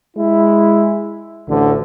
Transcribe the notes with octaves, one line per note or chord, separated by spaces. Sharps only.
G#3 E4
A1 D2 D3